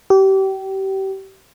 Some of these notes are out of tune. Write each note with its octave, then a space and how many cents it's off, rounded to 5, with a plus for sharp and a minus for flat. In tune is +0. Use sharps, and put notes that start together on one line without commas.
G4 -30